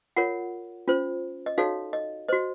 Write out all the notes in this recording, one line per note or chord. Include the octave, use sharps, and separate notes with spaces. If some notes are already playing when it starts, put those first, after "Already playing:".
F4 A#4 C#5 F#5
C#4 F4 C5
D#5
D#4 F#4 A4 C#5 F5
D#5
F#4 C5 D#5